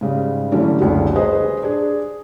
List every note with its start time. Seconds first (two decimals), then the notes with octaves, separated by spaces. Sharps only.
0.01 G#2 C#3 G3
0.52 D3 E3 F#3 G3 A3 C#4
0.81 F#1 C#2 D3 F#3
1.16 G#4 B4 C5 D#5
1.63 D4 G#4